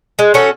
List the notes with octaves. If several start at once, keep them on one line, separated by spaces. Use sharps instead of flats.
G#3
C#4 F#4 A4